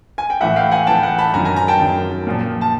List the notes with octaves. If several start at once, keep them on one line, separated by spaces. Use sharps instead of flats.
G#5
G5
A2 E3 E5 F#5
F5 G5
F#5 G#5
A2 E3 G5 A5
F#5 G#5
A5 B5
F#2 D#3 G#5 A#5
G#5 A#5
G#5 A#5
G5 A5
F#2 D#3
A#2 F3
A5